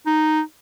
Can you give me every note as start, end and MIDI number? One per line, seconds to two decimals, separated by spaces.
0.06 0.41 63